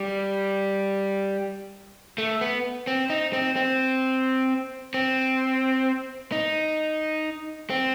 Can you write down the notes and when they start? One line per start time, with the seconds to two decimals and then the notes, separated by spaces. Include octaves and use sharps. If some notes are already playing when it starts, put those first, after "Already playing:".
Already playing: G3
2.18 A3
2.41 B3
2.87 C4
3.10 D#4
3.33 C4
3.56 C4
4.94 C4
6.32 D#4
7.70 C4